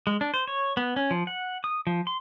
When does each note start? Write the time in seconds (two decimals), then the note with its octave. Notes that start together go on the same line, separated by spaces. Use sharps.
0.07 G#3
0.21 D4
0.34 C5
0.47 C#5
0.77 B3
0.96 C#4
1.11 F3
1.27 F#5
1.64 D#6
1.87 F3
2.07 C6